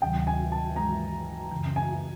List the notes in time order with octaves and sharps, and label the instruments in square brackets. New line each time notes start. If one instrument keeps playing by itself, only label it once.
[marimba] D2 C3 D#3 F#3 [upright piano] G5
[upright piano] G#5
A5
[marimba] G2 E3 G#3 [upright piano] A#5
[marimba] F#2 C#3 E3
[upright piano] G#5